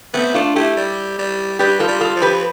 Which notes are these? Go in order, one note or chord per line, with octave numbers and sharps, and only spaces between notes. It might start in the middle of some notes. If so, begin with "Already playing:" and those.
A3 B3 C4
A3 D4 F4
A3 E4 G4
G3
G3
G3 G4 B4
F4 A4
G3
F4 A4
F3
G4 B4